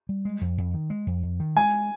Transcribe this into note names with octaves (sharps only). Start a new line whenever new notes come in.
G3
G#3
F2
F2
D#3
G#3
F2
F2
D#3
G#3 G#5